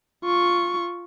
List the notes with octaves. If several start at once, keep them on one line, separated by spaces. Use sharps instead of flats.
F4 C#6